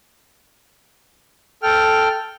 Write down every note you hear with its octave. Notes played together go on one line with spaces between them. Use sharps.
A4 G5 F6